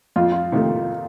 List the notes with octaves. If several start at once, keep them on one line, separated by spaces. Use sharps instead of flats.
F2 F4
F4
C3 D#3 A3